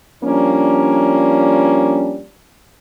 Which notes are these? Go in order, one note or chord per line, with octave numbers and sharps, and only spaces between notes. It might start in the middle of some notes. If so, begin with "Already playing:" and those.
F3 G3 A#3 C#4 D4